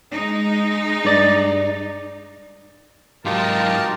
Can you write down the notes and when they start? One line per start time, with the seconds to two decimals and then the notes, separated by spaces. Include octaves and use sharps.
0.12 G#3 D#4
1.05 G2 D5 A6
3.25 G#2 F#3 D#4 F4 G4 A#4 A5